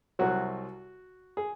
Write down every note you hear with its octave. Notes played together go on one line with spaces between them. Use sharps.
C2 C3 F#3 F#4
G#4